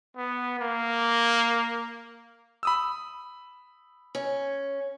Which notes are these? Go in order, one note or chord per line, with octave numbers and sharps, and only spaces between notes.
B3
A#3
B5 D#6 E6
C#4